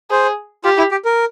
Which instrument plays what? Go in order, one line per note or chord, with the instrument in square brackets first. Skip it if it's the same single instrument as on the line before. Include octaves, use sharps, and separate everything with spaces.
[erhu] G#4 [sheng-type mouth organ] C5
[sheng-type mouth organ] F4 [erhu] G4
[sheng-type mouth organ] E4
G4
A#4